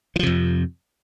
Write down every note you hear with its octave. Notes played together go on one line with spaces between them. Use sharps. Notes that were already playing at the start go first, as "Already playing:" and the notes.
F2 C3 E3 F3